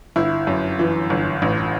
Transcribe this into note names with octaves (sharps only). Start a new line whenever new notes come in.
G1 E4
F#2
E3
G1
A1